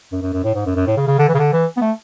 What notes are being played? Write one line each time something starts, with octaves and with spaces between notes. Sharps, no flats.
F#2
F#2
F#2
A2
G#2
F#2
F#2
A2
C#3
C#3
D3
E3
C#3
D3
E3
B3
A3